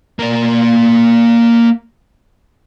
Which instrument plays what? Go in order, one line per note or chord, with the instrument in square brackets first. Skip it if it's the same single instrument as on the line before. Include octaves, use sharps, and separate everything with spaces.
[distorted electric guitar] A#3 D5